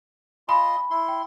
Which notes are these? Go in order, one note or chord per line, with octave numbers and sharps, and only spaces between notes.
F4 D#5 G#5 B5 C6
E4 C6
G5